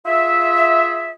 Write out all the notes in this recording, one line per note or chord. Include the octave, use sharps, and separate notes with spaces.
F4 G#4 E5